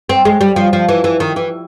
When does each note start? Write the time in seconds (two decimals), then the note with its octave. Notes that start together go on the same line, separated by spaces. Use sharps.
0.09 C4
0.25 G#3
0.41 G3
0.56 F3
0.73 F3
0.89 E3
1.04 E3
1.20 D#3
1.36 E3